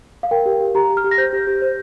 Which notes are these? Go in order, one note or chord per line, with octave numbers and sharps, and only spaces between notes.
F5
A#4 G5
G4
G4
G4 A#5
G4
F6
G4
A#6
C5 G6
G4
G4
C5